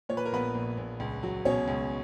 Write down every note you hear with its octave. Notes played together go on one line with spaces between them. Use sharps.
A#2 C#5
B4
A#4
A#1 B3 B4
A#1
A#1
C#2
F#3
B2 C#4 C#5
C#2